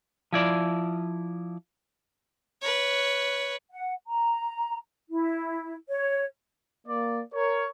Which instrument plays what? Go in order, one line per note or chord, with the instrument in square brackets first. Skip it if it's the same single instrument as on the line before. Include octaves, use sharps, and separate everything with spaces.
[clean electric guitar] F3 E4 D5
[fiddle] B4 C#5
[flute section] F#5
A#5
E4
C#5
[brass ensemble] A#3 D5
A#4 C#5